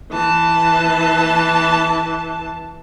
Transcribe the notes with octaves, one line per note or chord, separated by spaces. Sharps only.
E3 A5